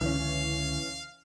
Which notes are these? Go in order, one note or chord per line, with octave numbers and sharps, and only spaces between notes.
C#2 D3 E3 C#4 F5